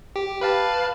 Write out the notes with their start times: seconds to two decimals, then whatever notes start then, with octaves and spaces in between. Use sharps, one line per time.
0.16 G4
0.41 B4 F5 A5